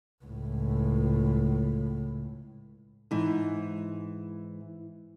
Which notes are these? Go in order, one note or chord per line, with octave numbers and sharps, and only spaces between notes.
C#2 A2
G#2 E3